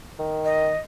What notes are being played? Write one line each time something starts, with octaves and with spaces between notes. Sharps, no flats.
D#3
D#5